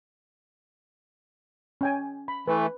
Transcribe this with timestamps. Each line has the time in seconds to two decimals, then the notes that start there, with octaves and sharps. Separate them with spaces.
1.81 C#4 G5 G#5
2.28 B5
2.48 E3 A3 B4